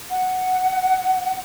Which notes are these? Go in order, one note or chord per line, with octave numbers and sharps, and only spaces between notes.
F#5